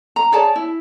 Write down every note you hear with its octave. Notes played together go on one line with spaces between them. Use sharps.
A#5
G#4 C#5 D5 A5
E4